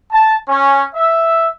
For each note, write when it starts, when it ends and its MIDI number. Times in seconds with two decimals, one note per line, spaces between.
0.12 0.35 81
0.48 0.83 61
0.94 1.48 76